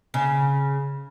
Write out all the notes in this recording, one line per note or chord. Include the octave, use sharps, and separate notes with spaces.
C#3